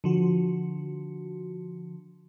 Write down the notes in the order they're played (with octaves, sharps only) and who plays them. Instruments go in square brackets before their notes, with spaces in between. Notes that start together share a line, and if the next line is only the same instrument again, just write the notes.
[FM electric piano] D3 F3 F#4